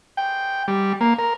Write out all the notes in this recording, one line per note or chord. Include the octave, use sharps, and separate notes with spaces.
G5
G3
A#3
A#4